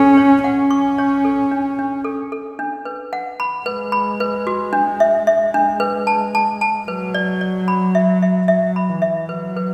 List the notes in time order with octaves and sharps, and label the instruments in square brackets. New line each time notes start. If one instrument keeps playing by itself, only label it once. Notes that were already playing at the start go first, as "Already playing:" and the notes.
Already playing: [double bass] C#4 [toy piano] A4
[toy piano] C#5
[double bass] C#4 [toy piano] F#5
[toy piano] C#6
C#5
A4
D4
D4
A4
A4
D4
B4
F#5
B5
[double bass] G#3 [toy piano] B4
[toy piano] B5
B4
F#4
D4
E5
E5
D4
B4
A5
A5
A5
[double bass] F#3 [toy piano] B4
[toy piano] D5
D5
B5
E5
E5
[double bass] F#3 [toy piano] E5
[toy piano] B5
[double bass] E3
[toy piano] E5
[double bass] F#3 [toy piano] B4
[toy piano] B4